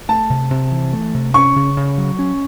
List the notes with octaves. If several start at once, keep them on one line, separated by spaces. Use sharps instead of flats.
A3 A5
C3
C3
E3
A3
C3
C#4 C#6
C#3
C#3
F#3
C#4